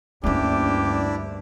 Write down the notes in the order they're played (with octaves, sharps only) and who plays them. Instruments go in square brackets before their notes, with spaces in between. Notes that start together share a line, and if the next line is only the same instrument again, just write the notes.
[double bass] D2 G2 [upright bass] A#3 C#4 [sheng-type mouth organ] D4 E4 [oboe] G4